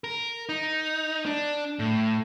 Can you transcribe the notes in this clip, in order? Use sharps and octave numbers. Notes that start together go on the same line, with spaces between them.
A#4
D#4
D4
A2